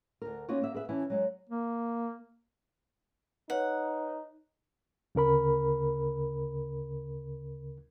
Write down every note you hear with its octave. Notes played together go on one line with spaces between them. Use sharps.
D2 A#4
A#3 C#4 D#4 F4 F#4
A#3 E5
G#4 B4 E5
E3 C#4 E4 E5 A5
F#3 G#3
A#3
D#4 B4 C#5 F#5
D2 C#3 A#4 B5